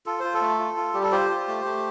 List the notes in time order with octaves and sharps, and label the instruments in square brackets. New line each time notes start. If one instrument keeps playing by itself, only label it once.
[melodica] F4 A4
F4 C5
A4
A3
F4
F4
G3 G4
A4
F4 G4 C5
F4
A3
A3